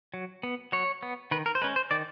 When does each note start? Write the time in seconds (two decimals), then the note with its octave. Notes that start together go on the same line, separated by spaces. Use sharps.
0.14 F#3
0.43 B3
0.72 F#3 C#5
1.03 B3
1.31 D#3 B4
1.46 A#4
1.55 C5
1.62 G#3 C#4 B4
1.76 C5
1.91 D#3 D5